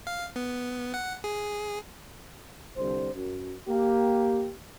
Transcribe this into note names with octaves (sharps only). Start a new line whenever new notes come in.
F5
B3
F#5
G#4
C2 D3 C5
F#2
A#3 G4